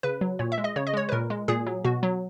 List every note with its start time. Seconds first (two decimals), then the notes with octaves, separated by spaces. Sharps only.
0.03 C#3 B4
0.21 F#3
0.39 A#2 C#5
0.52 E5
0.58 G#3
0.64 D#5
0.76 C#3 C#5
0.87 D#5
0.93 G#3 C#5
1.09 B4
1.12 A#2 A#4
1.30 G#3
1.48 A#2 G#4
1.67 F#3
1.85 B2 F#4
2.03 F#3